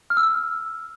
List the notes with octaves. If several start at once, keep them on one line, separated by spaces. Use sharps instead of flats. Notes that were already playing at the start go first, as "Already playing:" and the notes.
F6
E6